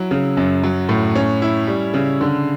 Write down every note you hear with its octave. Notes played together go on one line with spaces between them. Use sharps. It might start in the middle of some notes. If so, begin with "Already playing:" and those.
Already playing: F#3 E4
C#3
F#2
F#3
A2
C#4
E4
G3
C#3
D3